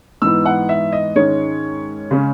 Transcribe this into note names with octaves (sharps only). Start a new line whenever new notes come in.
G#2 E3 B3 E6
F#5
E5
D#5
G#2 D#3 G#3 C#4 C#5
C#3 G#3 C#4